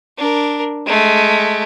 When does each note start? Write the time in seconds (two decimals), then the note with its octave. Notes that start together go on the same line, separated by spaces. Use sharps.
0.18 D4 A#4
0.86 G#3 A3